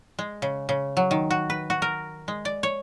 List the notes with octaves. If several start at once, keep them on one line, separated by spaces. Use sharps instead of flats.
G#3
C#3
C#3
F#3
D#3
F#4
B4
F#4
A#4
G#3
D5
C#5